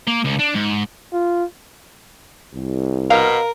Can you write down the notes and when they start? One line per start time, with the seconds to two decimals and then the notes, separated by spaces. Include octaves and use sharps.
0.07 A#3
0.25 C#2
0.39 D4
0.55 G#2
1.13 F4
2.54 C2
3.10 B2 A#4 F5